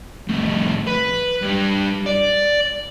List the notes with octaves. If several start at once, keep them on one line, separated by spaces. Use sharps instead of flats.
F2 A2
B4
G2 G3
D5